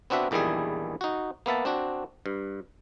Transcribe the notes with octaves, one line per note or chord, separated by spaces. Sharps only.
B3 C4 D4 F#4 E5
A#1 E2 D#3 G3 E4 G#4
D#4 F#4
A#3 B3 E5 A5
C4 D4 F#4
G2